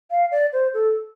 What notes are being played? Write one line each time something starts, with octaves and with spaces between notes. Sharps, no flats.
F5
D5
C5
A4